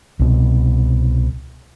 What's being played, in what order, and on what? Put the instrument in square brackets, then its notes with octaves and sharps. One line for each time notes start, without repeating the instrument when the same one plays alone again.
[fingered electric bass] C2 B2